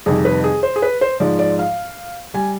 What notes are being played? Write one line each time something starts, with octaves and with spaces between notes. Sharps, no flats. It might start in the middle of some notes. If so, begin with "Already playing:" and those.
F2 C3 D#3 G3 G#4
B4
G#4
C5
G#4
B4
C5
G#2 F3 G#3 D5
D5
F5
G3 G#5